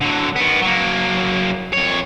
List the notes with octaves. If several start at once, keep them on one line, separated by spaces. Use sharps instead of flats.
D3 F#3
D#3 B3
F#3 A#3
F2 C#5